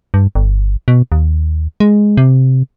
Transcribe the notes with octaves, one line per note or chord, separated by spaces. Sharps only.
G2
G1
B2
D#2
G#3
C3